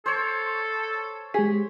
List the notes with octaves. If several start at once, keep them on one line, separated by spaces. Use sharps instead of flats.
A4 C5 C#5
G#3 G4 G#4 B6